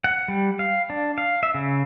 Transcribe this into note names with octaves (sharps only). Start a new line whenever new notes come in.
F#5
G3
F5
D4
F5
E5
C#3